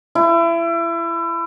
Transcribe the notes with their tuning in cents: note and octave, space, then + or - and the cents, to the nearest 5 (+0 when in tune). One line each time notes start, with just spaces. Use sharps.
E4 +30